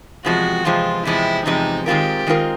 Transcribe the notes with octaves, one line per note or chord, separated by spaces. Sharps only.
E2 C3 F3 G#3 C4 F#4
E2 C3 F3 G#3 C4 F4
E2 C3 F3 G#3 C4 E4
E2 C3 F3 G#3 C4 D#4
D#3 G#3 C4 F4 G4 A#4
D#3 G#3 C4 F4 A#4